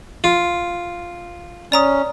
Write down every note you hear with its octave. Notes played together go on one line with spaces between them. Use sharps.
F4
C#4 D5 A#5 D#6